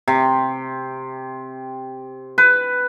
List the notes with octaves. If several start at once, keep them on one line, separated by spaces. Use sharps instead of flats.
C3
B4